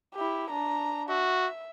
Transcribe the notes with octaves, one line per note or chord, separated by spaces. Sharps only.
E4 G4
D4 A#5
F#4 E5